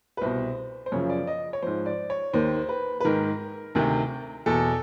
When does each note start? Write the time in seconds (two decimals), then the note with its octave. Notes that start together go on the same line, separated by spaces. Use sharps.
0.17 B4
0.21 C2 B2 C5
0.86 C5
0.92 F#2 C#3 F3 C#5
1.10 D5
1.27 D#5
1.53 C#5
1.62 G#2 F3 C5
1.86 D5
2.10 C#5
2.33 D#2 D#3 C5
2.69 B4
3.00 B4
3.05 G#2 D#3 A#4
3.75 D2 C3 D#3
4.46 E2 B2 A4